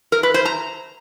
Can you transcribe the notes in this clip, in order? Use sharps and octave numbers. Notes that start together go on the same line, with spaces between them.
A#4
B4
C5
A#5